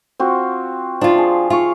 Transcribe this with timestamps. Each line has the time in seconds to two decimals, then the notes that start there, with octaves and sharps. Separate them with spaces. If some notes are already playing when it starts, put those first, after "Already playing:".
0.20 C4 F4 F#4
1.01 F3 D4 F4
1.18 G#4
1.50 F4 F5 C#6